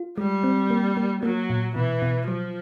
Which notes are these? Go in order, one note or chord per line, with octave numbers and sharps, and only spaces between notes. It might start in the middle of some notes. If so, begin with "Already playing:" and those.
Already playing: F4
G3 G#3
C4
A#3
A#3
F#3 A#3
A#2
B2 E3
B2
F3 F#3